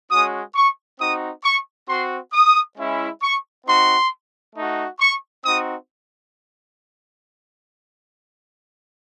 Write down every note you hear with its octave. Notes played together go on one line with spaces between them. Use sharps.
G#3 C#4 F#4 D#6
C#6
C4 D#4 F#4 D#6
C#6
C4 F#4 C6
D#6
G#3 C#4 E4
C#6
C4 D#4 F#4 C6
A3 D#4 F#4
C#6
C4 D#4 F#4 D#6